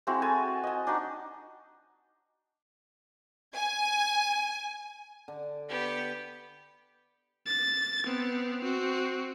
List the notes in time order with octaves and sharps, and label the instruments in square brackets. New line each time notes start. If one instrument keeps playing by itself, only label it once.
[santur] G#3 C4 E4 F#4
A4 G#5 A5
D#5 G#5
D4 D#4 F#4
[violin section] G#5
[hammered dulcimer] D3
[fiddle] B3 G4
[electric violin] A6
B3 C4
C4 F#4